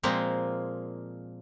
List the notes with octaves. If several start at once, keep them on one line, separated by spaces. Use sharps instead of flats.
A#2 F3 G#3 A#3 C4